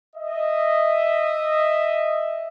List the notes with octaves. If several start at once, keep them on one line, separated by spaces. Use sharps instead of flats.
D#5 E5